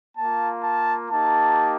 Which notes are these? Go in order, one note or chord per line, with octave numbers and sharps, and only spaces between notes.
A#3 F4 A5
A5
A#3 D#4 G4 A5